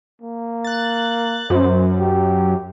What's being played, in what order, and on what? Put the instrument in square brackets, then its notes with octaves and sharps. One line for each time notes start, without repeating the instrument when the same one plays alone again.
[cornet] A#3
[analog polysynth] F#6 A6
[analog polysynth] F#2 [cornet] C5
[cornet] G4